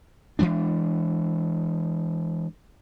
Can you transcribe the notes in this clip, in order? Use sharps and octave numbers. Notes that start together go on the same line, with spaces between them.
E3 F#3 G#3 D4